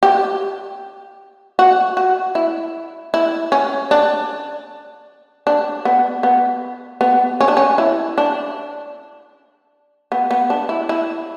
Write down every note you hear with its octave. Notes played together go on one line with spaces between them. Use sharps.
G4
F#4
F#4
E4
E4
C#4
D4
D4
B3
B3
B3
C#4
D4
C#4
E4
D4
B3
B3
D4
E4
E4